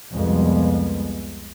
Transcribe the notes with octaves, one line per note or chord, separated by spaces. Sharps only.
C2 F2 F3 G3 G#3 B3